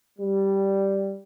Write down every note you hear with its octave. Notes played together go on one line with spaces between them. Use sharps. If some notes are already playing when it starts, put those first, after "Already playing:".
G3